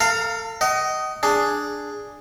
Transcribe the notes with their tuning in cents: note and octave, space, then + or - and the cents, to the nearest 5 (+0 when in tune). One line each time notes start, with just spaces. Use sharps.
A4 +35 F5 +0 A#5 +0
D#5 +0 F#5 +40
D4 +0 G#4 +0